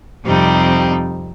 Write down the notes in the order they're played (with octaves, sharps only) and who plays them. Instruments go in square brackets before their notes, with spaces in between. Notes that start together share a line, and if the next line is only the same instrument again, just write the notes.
[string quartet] F2 C3 G3 C4 D#4